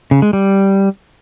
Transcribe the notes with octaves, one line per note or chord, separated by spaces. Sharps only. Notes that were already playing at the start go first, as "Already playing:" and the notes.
C#3
G#3
G3